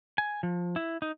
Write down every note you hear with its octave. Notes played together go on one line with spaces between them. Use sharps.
G#5
F3
E4
D#4